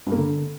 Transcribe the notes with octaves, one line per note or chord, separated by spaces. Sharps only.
G2
A#3
D3